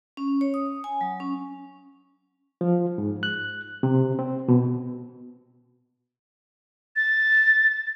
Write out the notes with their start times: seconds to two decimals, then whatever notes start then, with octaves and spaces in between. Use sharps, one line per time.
0.17 C#4
0.41 C#5
0.54 D#6
0.84 G#5
1.01 F#3
1.20 C#4
2.61 F3
2.98 G#2
3.23 F#6
3.83 C3
4.19 C4
4.48 B2
6.96 A6